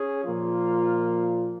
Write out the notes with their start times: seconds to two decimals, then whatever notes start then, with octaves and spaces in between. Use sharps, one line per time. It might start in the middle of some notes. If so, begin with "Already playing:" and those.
Already playing: C#4 G#4
0.25 A#2 F3 A#3 F4